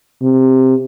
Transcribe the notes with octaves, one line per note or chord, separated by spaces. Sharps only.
C3